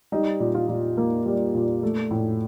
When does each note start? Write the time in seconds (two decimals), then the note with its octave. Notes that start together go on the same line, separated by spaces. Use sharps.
0.12 G3 D#4
0.40 A#2
0.55 F4
0.69 A#2
0.97 A#3
1.26 G3
1.55 A#2
1.83 A3
2.11 A2